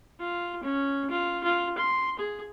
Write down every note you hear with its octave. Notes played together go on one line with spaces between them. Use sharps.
F4
C#4
F4
F4
C6
G#4